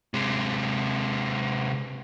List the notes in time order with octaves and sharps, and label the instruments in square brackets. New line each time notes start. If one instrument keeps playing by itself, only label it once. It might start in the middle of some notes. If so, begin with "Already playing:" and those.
[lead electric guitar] C3 G#3